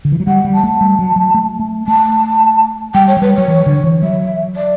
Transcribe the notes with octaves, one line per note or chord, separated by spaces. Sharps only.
D3
E3
F#3
G3 F#5
G3
A5
A3
G3
F#3
F#3
A3
A3
A3 A5
G3 G5
C#5
F#3
G3 B4
F#3 C#5
E3
D3
E3
F#3 E5
D5